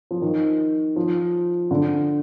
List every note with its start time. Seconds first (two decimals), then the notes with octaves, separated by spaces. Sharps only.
0.11 F3
0.22 D#3
0.96 F3
1.71 D3